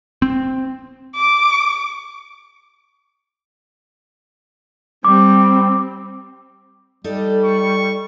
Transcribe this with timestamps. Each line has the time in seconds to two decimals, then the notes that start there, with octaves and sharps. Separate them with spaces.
0.22 C4
1.16 D6
5.05 G3 C4 D6
7.04 G3 D#4 A4 D5
7.45 C#6